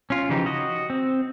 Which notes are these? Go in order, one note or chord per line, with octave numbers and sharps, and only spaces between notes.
C#4 F4
C#3 E3 F3 D#4 G4
F#4 D#5
C4